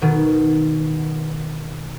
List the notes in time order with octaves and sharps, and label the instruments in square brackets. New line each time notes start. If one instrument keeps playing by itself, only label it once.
[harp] B2 D#3